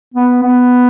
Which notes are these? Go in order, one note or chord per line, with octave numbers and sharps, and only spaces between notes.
B3
B3